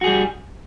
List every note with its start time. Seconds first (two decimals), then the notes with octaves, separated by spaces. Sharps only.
0.01 F#4
0.04 G#4
0.07 G3